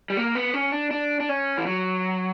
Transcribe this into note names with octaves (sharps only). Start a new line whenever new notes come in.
G3
A#3
B3
C#4
D4
D4
D4
C#4
E3
F#3